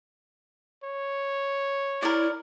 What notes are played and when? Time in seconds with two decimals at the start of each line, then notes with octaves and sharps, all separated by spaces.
0.84 C#5
2.02 E4 A#4 D5